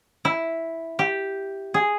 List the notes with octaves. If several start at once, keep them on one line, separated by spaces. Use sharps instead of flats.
E4
G4
G#4